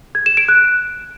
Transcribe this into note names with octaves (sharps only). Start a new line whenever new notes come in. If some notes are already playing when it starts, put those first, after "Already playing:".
G#6
E7
D7
F#6